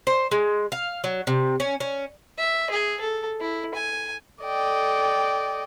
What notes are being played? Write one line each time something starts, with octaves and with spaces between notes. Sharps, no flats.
C5
G#3
F5
F#3
C3
C#4
C#4
E5
G#4
A4
E4
G#5
A4 D5 D#5 G5